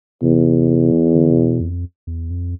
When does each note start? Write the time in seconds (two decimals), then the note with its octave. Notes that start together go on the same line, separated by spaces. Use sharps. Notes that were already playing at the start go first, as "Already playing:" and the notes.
0.22 E2 C3
0.92 E3
1.15 D3
1.31 C3
1.38 B2
1.61 F2
2.07 E2
2.31 F2